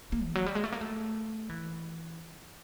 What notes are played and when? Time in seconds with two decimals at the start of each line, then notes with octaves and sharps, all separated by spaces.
0.12 A#3
0.24 E3
0.35 F#3
0.46 G3
0.55 G#3
0.64 A3
0.72 A#3
0.81 A3
1.49 E3